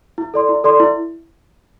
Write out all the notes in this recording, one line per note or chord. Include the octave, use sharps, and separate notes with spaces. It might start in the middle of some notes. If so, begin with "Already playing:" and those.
E4
A4 D5 C6
E4
A4 D5 C6
E4